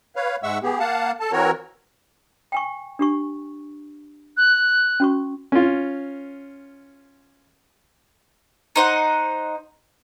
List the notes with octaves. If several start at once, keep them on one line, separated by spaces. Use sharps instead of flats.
B4 C#5 F5
G#2 G#3 E5 F#5 C#6 E6
B3 G4 G#4
A#3 F5 F#5 A5
A4 A5
E3 C4 F#4 A#4 C#5
G5 G#5 C#6
D4 G4 C#6
F#6
C#4 F#4 C#6
C#4 F4
D#4 C5 F#5